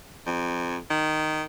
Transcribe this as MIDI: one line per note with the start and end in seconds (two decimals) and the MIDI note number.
0.27 0.77 41
0.90 1.44 51